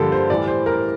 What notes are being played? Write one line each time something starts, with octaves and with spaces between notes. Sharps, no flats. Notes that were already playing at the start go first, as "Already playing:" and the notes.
Already playing: G2 D3 F3 A#3 G4 A4
C5
A2 E3 G3 D5
C5
A#4